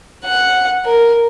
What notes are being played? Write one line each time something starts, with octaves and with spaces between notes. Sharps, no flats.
F#5
A#4